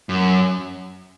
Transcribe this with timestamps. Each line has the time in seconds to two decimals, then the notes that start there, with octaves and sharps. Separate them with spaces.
0.09 F#2